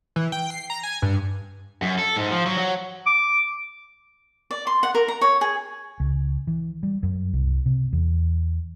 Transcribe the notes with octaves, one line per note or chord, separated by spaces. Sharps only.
E3
G5
C7
A#5
G#5
G2
F#2
A4
G#2
F3
F#3
F#3
D6
D5
C6
F#5
A#4
A#5
C#5
G#4
C#2
E3
G3
F#2
C2
C3
E2